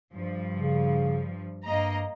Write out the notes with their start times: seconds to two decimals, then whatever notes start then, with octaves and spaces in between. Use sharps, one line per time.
0.14 G2 F3
0.55 C#3
1.65 G2 A#3 D#5 A#5